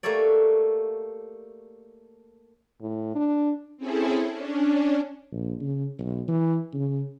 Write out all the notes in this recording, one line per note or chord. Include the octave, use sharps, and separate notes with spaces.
A3 A#3 G4 A4 C#5 D5
A2
D4
C4 C#4 E4 G#4 A4
C#4 D4
A#1
C#3
B1
E3
C#3